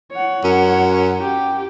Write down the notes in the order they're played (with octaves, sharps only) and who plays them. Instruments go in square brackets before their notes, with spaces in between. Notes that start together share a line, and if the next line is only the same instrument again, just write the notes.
[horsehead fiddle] C#5 F#5
[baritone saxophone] F#2
[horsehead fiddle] G4